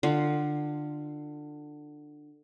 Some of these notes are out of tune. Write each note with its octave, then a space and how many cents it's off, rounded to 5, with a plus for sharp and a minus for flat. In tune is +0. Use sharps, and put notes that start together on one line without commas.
D3 +20 F4 +0